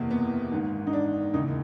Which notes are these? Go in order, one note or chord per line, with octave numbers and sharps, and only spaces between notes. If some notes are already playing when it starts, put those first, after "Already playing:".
Already playing: F#1 E2 C3 A#3
B3
G#1 G#2 D#3
D#4
D4
E1 D#2 C#3 E3 D#4